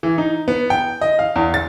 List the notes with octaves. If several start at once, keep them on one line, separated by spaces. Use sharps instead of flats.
E3
D#4
B3
G5
D#5
F5
E2
A6